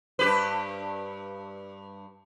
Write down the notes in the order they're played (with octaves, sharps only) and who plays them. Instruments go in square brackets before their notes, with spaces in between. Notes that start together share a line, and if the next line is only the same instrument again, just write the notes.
[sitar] G2 G4 B4